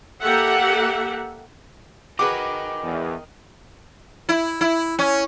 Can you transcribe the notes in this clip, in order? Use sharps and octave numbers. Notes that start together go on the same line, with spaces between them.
A#3 G4 A4 E5 F#5
F#4 G#4 A#4 B4 D#5 G5 D6
E2
E4
E4
C#4